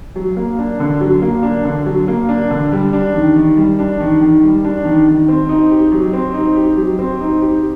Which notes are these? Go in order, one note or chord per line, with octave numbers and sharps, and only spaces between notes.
F#3
A#3
D4
D3
F#3
A#3
D4
D3
F#3
A#3
D4
D3
G3
D4
D#3
D#3
G3
D4
D#3
D#3
G3
D4
D#3
D#3
C4
D#4
G4
F#3
C4
D#4
G4
F#3
C4
D#4
G4